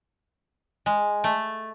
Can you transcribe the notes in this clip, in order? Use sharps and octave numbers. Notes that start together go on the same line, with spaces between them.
G#3
A3